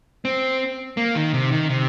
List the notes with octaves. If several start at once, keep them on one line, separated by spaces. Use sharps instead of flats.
C4
A#3
D#3
C3
D#3
C3